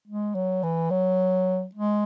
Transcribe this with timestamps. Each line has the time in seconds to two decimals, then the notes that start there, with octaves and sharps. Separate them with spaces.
0.07 G#3
0.34 F#3
0.63 E3
0.90 F#3
1.75 G#3